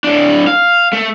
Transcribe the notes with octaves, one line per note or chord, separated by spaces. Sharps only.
A2 D4
F5
A3